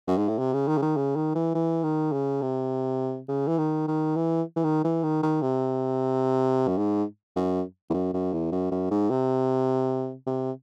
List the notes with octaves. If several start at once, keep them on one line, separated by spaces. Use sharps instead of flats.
F#2
G#2
A2
C3
C#3
D#3
C#3
D#3
C#3
D#3
E3
E3
D#3
C#3
C3
C#3
E3
D#3
D#3
E3
E3
D#3
E3
D#3
D#3
C3
F#2
G#2
F#2
E2
F#2
F#2
E2
F#2
F#2
G#2
C3
C3